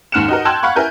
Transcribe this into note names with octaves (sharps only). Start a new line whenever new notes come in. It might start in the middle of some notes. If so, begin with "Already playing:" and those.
D#2 G#2 F6 F#6 C#7 E7
D#4 F#4 A#4
G5 A5 C6 E6 F#6 G#6
F5 F#5 B5 C#6
E4 A#4 G#5 G6